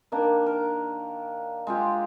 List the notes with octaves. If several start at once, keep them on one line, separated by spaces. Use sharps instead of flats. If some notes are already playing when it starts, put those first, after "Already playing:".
D#3 A#3 D4
A#4
G#3 F4 G4